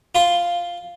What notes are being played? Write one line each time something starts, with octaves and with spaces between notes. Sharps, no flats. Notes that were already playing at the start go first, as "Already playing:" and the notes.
F4 C6